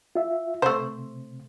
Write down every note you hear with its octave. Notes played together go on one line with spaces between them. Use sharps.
F4 E5
C3 A3 C5